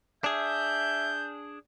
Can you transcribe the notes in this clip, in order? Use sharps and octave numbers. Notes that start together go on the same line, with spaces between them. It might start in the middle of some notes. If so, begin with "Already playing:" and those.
D4 G#4 E5 G6